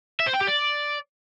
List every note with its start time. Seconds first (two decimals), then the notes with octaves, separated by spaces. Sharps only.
0.20 E5
0.27 C5
0.34 G5
0.41 G4
0.48 D5